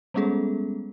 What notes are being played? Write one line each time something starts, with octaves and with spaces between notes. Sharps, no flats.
G3 G#3 B3 C#4 G#4 A4